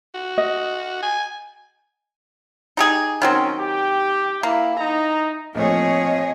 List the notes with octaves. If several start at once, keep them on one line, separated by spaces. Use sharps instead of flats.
F#4
D#5
G#5
D#4 G4 G#4
D#3 F#3 C4 C#4 G5
G4 G5
A#3 E4
D#4 A#5
A#1 A2 F3 A3 C4 G#4 C#5 D#5